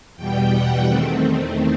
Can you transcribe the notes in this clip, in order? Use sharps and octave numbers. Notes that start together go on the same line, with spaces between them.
E2 B2 G3 G5
F#5
E2 D#3 A3 C4